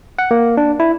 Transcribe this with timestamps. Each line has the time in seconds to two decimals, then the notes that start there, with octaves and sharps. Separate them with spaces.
0.19 F#5
0.31 A#3
0.57 D4
0.80 E4